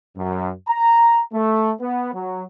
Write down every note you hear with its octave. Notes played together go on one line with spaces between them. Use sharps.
F#2
A#5
A3
B3
F#3